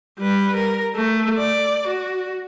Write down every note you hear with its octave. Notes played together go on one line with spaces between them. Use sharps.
G3 B4
A#4
A3
D5
F#4